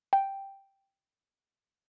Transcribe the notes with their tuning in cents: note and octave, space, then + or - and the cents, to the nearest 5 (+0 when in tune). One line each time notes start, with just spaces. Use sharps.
G5 +0